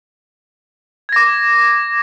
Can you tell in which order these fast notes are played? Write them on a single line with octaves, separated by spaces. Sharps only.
G#6 A#6 D6